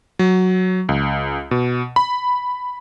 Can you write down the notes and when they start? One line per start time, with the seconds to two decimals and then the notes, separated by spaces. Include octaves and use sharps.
0.19 F#3
0.89 C#2
1.51 B2
1.96 B5